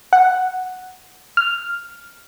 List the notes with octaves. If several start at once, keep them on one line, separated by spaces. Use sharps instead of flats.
F#5
F6